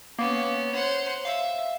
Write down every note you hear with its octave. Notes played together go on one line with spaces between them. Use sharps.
A#3 B3 C#4
C5 C#5 F#5
E5 F5